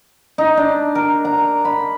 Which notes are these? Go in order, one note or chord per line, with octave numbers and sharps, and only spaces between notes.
D#4
D4
A#4
A#5
B5